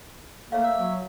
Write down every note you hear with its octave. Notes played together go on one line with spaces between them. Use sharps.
A3 A#3 C#5 F5
E5
F#3